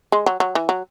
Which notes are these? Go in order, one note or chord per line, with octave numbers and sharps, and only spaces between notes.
G#3
F#3
F#3
E3
F#3